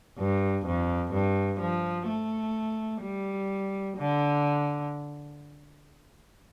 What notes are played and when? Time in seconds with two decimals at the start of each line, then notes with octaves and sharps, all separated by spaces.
0.19 G2
0.66 F2
1.13 G2
1.60 F3
2.08 A3
3.02 G3
3.97 D3